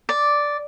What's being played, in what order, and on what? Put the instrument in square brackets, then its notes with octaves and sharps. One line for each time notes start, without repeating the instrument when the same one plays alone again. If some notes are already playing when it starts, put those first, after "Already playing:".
[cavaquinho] D5